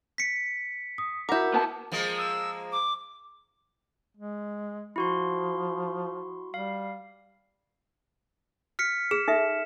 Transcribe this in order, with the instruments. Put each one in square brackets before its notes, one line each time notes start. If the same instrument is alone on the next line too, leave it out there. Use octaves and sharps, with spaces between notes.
[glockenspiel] B6 C#7
[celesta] D#6
[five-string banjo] E4 A#4 [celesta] F#4 F#5 [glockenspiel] D6 G6
[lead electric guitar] B3 A5
[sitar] F3 G#3 A#3
[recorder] E6
D6
[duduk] G#3
[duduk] F3 [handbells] E4 F#4 C6
[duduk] G3 [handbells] F5
[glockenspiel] F6 B6 C#7
[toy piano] G#4 [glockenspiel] E7
[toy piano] D#4 A4 E5